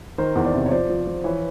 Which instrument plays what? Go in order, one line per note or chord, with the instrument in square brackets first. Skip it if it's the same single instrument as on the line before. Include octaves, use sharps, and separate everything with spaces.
[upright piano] D#3 [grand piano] A#4 C5
[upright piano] E2
[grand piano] C5 D5
[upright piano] C3
[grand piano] C#5
[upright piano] F3 [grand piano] C5 D5
[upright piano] F3
F3
[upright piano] E3 [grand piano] B4 C#5